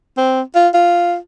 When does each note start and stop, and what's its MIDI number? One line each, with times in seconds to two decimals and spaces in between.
0.17 0.41 60
0.55 0.68 65
0.74 1.17 65